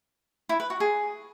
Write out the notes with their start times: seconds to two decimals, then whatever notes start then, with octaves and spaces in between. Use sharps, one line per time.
0.49 E4
0.60 B4
0.70 F#4
0.80 G#4